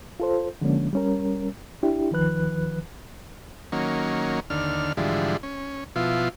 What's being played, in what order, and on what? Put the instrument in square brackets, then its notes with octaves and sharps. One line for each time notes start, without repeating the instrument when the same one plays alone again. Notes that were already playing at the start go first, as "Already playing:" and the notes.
[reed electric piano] F4 A4 C5
D3 F3 G#3 A#3 C#4 D4
G3 C#4 A#4
D4 E4 G4
D2 D#3 F3 B4 F#6
[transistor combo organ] D#3 F#3 A#3 C#4
D#2 D3 F6
G#2 D3 E3 F3 G3
C#4
B2 F3 E4 F4